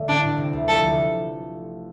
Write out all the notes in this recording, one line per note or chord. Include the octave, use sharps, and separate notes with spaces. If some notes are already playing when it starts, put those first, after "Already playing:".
Already playing: D3 A3
A1 D4
A1
C3
D2
F3 A4
D2